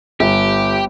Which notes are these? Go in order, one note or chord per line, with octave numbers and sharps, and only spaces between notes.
G1 G4